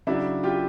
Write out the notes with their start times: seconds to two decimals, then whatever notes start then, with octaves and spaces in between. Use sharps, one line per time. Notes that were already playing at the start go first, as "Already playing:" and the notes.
0.07 C#3 F#3 D4 E4
0.43 F4 G4